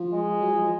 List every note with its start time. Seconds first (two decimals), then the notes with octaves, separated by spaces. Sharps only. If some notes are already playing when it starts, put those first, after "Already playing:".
Already playing: F3
0.13 G#3
0.41 F#3
0.52 F3
0.64 F3